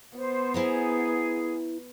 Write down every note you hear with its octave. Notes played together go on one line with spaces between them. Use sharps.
B3 C5
E4 G#4 C5 A#5